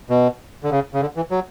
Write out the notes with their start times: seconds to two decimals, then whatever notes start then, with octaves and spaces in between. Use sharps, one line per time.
0.10 B2
0.64 D3
0.71 C#3
0.94 C#3
1.01 D3
1.16 E3
1.31 F#3